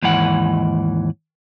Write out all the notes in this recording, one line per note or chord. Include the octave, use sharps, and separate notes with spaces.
D#2 G#2 E3 F#5